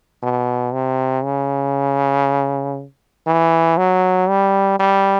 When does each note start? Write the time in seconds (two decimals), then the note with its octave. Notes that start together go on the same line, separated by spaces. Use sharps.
0.23 B2
0.73 C3
1.24 C#3
3.27 E3
3.77 F#3
4.29 G3
4.79 G3